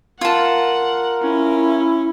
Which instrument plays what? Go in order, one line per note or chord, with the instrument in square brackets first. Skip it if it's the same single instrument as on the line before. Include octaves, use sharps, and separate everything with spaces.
[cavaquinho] F4 A5 [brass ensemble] A#4 [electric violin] F#5
[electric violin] C#4 [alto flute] E4